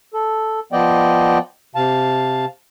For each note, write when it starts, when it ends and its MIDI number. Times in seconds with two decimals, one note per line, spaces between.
0.14 0.60 69
0.72 1.38 53
0.72 1.38 59
0.72 1.38 74
0.72 1.38 75
0.72 1.38 79
1.75 2.45 48
1.75 2.45 77
1.75 2.45 81